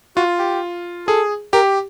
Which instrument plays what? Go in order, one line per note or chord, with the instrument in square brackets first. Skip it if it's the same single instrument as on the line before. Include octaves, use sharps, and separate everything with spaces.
[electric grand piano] F4 [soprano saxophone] F#4
[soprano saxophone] G4
[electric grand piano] G#4 [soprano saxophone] A4
[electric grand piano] G4 [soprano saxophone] A#4